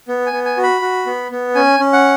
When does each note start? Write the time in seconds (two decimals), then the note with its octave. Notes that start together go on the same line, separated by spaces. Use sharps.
0.08 B3
0.26 G#5
0.33 B3
0.45 G#5
0.57 F#4
0.63 B5
0.81 F#4
1.06 B3
1.31 B3
1.55 C#4 G#5
1.80 C#4
1.93 F#5